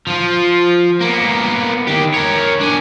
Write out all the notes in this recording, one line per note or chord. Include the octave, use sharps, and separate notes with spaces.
F3 F4
A#3 B3
D#3 G4
A#4 C#5
D4 G#5